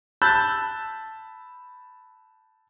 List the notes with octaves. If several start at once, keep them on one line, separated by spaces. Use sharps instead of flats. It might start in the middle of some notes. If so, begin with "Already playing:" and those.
A5 B5 E6 F#6 G6 A6